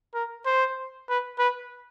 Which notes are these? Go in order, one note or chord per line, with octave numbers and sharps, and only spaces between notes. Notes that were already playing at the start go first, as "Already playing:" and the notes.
A#4
C5
B4
B4